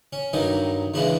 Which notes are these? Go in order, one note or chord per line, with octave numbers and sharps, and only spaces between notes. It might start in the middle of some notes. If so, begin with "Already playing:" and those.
C#4
G2 D#3 F#3 D#4
E2 C#3 E3 G#3 D4